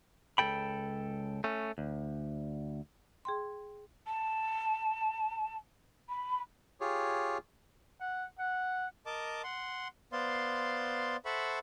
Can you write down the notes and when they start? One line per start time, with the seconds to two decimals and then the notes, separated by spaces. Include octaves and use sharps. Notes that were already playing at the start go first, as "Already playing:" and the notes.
0.38 C#2 G2 A4 G5 B5
1.44 A3 C#4
1.78 D2
3.25 G#4 G5 C6
4.07 A5
6.09 B5
6.80 F4 G4 G#4 C#5
8.01 F#5
8.39 F#5
9.06 A#4 D#5 A5 D6
9.44 F#5 C6
10.12 B3 C5 D5 F5 C6
11.25 A4 C5 E5 F#5 B5 C#6